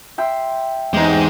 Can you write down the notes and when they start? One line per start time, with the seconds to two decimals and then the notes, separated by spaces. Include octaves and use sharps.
0.18 E5 G5 C6
0.93 E2 G#2 G#3 C4 D#4 G4